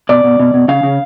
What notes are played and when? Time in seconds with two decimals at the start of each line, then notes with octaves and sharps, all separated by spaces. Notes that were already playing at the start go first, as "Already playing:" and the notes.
0.09 B2 D5
0.24 B2
0.39 B2
0.54 B2
0.68 C#3 F5
0.83 C#3